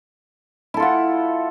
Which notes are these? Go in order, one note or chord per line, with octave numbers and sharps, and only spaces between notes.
E4 F4 A4 F#5